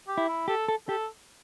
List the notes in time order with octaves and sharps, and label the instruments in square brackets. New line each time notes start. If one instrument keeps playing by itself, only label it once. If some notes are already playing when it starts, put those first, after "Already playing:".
[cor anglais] G4
[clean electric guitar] E4
[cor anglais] E4
[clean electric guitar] G4 [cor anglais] A4
[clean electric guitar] A4
[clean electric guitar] G4 [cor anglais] A4